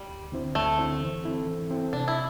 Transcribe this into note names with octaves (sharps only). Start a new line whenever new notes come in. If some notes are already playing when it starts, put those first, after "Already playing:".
Already playing: G3
D2
D3 C4 E4 C5
D2 A3
D3 C4 E4 C5
E3
C4 E4 A4
E3
C4 E4 A4
C3 D4
E4